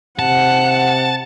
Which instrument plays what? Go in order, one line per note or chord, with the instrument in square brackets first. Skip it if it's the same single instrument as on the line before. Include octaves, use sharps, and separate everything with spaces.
[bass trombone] C3 [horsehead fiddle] F#5 [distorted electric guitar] A5